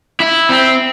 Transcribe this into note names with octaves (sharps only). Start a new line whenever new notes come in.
E4
C4